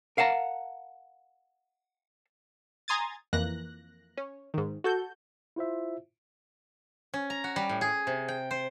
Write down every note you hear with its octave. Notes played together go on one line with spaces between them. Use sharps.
A#4 F5 F#5 A5 A#5
G#5 A#5 C6 D#6 G#6 A6
F2 E3 A#3 F#6 A#6
C#4
G#2 D#3
F#4 A4 G6
E4 F4 C5 E5
C#4
A#5
F#4
G3
A2
G#4
C3
G5
C5